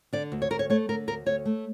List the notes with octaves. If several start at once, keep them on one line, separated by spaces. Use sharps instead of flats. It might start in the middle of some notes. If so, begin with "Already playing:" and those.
D3 D5
D2
C#5
D2 A#4
C#5
A3 C#5
D3 A#4
D2 A#4
D2 C#5
A3